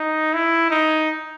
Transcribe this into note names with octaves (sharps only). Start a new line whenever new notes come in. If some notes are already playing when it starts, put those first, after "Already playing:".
Already playing: D#4
E4
D#4